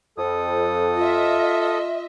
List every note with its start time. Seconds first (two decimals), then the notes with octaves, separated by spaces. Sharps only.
0.18 F2 A4 D#6
0.96 F4 D#5 E5